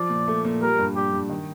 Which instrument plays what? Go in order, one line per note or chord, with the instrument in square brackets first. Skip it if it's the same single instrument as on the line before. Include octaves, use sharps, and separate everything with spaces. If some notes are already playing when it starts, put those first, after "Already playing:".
Already playing: [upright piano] F3 [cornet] D5
[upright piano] A#2
A3
A#2
[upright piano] G3 [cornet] A#4
[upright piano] G2
[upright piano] G2 [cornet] G4
[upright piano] G2
D#3